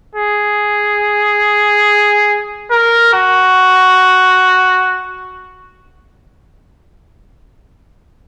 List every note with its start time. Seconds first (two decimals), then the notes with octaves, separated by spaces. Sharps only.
0.15 G#4
2.71 A#4
3.14 F#4